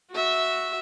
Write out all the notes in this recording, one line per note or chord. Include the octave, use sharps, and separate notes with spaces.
F#4 E5